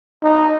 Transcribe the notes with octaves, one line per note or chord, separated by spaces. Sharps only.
D#4